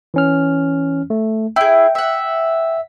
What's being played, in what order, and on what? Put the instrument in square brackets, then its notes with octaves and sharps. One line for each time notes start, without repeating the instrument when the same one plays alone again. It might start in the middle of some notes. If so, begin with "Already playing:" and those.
[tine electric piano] E3 C#4 F6
A3
[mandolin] E4 G#4 [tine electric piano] G5
[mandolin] E5 F#5